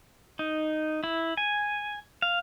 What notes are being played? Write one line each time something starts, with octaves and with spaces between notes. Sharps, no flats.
D#4
E4
G#5
F5